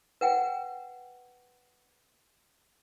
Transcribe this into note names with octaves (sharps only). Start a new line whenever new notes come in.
B4 F#5 G5